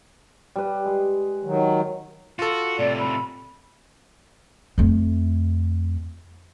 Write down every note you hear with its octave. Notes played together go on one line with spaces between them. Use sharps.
G3 B4
G#3
D#3 F#3
F4 F#4 A4
A2 C3 D5
B5
F2 A3